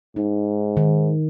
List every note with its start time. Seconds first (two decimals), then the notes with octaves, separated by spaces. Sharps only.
0.16 G#2 D#4
0.77 D#3